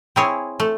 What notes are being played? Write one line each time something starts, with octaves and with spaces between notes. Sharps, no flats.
C4 E4 G#4 C#5
A3